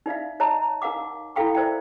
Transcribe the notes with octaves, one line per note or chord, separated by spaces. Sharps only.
D#4 D5 E5 F5
C#5 D#5 A5 A#5
D#4 A#4 F5 F#5 D6
E4 F4 A4 F5 G5 C#6
A#4 C5 D5 E5 G5